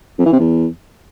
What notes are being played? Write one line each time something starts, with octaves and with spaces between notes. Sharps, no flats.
F2
E3
C3
E2